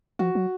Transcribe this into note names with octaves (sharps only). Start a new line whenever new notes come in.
F3 F#4
F#3